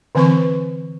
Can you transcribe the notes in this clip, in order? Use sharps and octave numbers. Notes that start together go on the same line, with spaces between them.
D3 E3 C4 B4 C#6